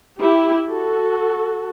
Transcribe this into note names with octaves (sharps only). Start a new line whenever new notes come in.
E4 G4
F#4 A4